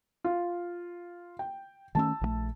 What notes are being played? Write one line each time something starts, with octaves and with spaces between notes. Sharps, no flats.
F4
G5
D#3 A3 C#4 A5 E6
A#1 D#3 A3